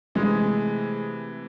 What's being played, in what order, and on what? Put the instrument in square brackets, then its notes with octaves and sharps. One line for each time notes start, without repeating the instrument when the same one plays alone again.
[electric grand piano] C3 E3 A3 [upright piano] G#3